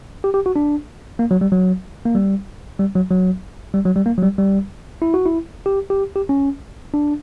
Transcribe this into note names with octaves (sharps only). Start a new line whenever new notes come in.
G4
G4
F#4
D4
A#3
F#3
G3
F#3
A#3
G3
G3
F#3
F#3
G3
F#3
G3
A#3
F#3
G3
G3
E4
F#4
E4
G4
G4
G4
C#4
D4